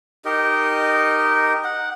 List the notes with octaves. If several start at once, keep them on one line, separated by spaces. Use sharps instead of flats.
D#4 G4 A#4 D#5
F#5